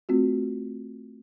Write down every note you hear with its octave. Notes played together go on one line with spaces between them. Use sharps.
A3 C4 F4 F#4